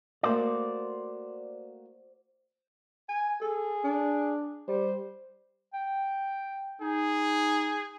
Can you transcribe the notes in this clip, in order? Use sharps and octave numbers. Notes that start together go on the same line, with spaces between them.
A3 A#3 F#4 C5 D5
G#5
G#4 A4
D4
G3 C5
G5
D#4 G#4